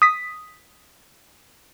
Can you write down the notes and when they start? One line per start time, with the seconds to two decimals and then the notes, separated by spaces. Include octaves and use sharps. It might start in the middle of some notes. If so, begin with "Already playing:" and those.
0.02 D#6 B6